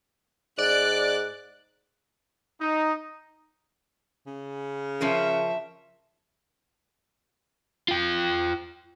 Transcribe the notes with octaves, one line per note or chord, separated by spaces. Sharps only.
G#2 D5 F#6 D7
D#4
C#3
F3 C#4 A#4 E5
F4 G5